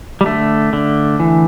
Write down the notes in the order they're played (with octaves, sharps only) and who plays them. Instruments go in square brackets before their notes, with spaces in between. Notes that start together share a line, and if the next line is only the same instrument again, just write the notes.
[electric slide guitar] G3
D3 A3
D3
E3